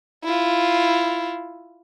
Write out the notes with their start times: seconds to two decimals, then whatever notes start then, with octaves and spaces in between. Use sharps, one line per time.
0.24 E4 F4